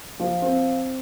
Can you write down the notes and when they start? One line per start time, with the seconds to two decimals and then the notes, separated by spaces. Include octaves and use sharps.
0.19 F3
0.42 C4